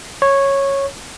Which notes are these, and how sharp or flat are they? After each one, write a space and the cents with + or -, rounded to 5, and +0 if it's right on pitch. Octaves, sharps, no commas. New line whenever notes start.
C#5 -10